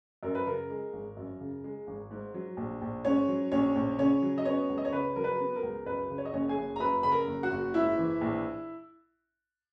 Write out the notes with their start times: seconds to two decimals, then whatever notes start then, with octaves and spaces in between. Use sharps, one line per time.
0.23 F#2 A#4
0.35 B4
0.46 C#3 A#4
0.70 G#3
0.93 G#1
1.17 F#2
1.40 C#3
1.64 G#3
1.87 G#1
2.11 G#2
2.34 F#3
2.57 A#1
2.82 A#1
3.04 G#2 C#4 C#5
3.28 F#3
3.51 A#1 C#4 C#5
3.76 A#1
3.99 C#3 C#4 C#5
4.22 F#3
4.38 D#5
4.45 B3 C#4 C#5
4.69 C#2
4.78 D#5
4.85 C#5
4.92 C#3 B4
5.16 F#3 A#4
5.24 B4
5.40 B3
5.56 A#4
5.63 C#2
5.86 F#2 B4
6.10 C#3
6.18 C#5
6.25 D#5
6.33 F#1 C#4 C#5
6.49 G#4 G#5
6.57 F#1
6.76 A#5
6.80 F#2 B4 B5
7.03 C#3 B5
7.12 A#4 A#5
7.27 F#1
7.43 F#4 F#5
7.51 F#1
7.74 G#2 E4 E5
7.98 E3
8.21 A#1